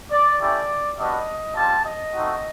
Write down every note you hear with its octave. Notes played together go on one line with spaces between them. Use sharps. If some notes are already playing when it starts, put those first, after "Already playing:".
D5
A3 C#4 E4 G4 D5
G3 B3 D4 F#4 D#5
G3 C4 F4 A5
D#5
A3 C4 D#4 F#4